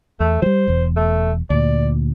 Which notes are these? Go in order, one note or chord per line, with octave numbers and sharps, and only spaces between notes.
E2 A3
F3 G3 C5
E1 E2
A3
D2 A#2 D5